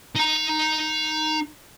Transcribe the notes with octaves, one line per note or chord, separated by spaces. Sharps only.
D#4 A#5